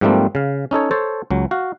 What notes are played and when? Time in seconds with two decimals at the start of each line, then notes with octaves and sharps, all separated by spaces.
0.01 G#2 F3 G3 A3 A#3 C4
0.35 C#3 F5
0.71 C#4 D#4 A4 C#5
0.91 A4 C5 C#5 A5
1.31 C#2 F#3
1.51 F#4 F5